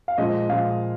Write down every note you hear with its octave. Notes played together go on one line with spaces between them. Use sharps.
F5
A#2 F3 G#3 D#5
A#2 F3 G#3 F5